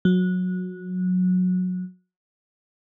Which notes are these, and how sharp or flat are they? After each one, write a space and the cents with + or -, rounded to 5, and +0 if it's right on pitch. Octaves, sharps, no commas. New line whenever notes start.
F#3 -20